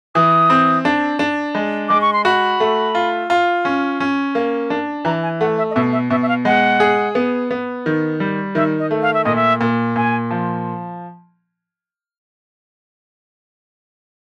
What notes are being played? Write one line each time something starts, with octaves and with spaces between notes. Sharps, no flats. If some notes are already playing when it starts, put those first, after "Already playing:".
E3 D#6
C4
D4
D4
G#3
G#3 D6
C#6
C6
F#4 B5
A3
F4
F4
C#4
C#4
A#3
D4
E3 A#5
G#5
A3 F#5
E5
D#5
B2 E5
E5
B2 E5
E5
F5
G#3 F#5
G#4
B3
B3
D#3
G3
D#3 E5
D#5
A3
F5
E5
A#2 D#5
E5
A#2
A#2 G#5
F3